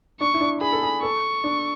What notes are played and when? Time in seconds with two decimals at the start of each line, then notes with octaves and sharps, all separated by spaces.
0.20 D4 C#6
0.34 E4
0.41 D4
0.61 G#4 B5
0.72 A4
0.83 G#4
1.03 A4 C#6
1.44 D4